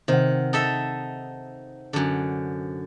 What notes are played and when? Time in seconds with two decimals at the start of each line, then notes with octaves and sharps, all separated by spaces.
0.08 C3 D#3 F#5
0.53 D#4 A4 E5
1.93 F#2 D3